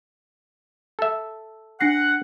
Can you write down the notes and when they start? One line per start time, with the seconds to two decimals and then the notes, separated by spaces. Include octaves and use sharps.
0.99 A4 E5
1.81 D4 F#5 A#6 C7